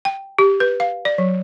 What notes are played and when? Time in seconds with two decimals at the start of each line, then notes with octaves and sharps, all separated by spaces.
0.05 G5
0.39 G4
0.60 B4
0.80 F5
1.05 D5
1.18 F#3